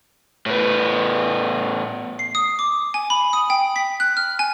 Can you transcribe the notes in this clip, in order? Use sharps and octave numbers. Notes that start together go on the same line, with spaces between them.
A2 B3
C7
D#6
D6
G#5
B5
D#6
G5
B6
F#6
F6
G#5